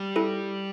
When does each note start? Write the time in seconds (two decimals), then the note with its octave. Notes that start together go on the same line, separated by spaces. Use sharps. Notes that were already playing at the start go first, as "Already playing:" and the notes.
Already playing: G3
0.16 E4 A4